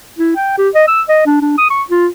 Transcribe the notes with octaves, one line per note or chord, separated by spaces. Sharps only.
E4
G5
G4
D#5
E6
D#5
D4
D4
D#6
C#6
F4